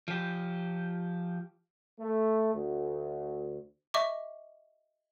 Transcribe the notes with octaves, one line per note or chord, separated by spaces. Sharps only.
F3 G4
A3
D2
D#5 E5 C#6 D6